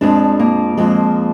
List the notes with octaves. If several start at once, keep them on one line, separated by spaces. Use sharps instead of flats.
F2 F3 G#3 D4
A#3
F2 F3 G#3